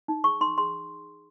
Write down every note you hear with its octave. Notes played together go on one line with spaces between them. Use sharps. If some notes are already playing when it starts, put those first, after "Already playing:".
D#4
G#4 C#6
D#4 C6
G#4 C6